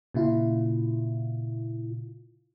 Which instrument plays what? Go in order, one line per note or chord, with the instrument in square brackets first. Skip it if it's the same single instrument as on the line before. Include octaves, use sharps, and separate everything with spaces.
[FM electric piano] A#2 C#3 E4 F4